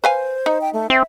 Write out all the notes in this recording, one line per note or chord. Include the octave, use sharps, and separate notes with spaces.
B4 C5 F5 G#5
D#4
G5
A3
C4 E5